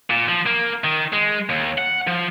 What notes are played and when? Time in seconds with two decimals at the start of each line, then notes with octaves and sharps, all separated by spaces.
0.10 A#2
0.28 F3
0.46 A#3
0.84 D#3
1.13 G#3
1.49 D#2
1.78 F#5
2.07 F3